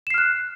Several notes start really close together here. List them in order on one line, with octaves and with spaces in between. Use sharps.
E7 C7 F6 F#6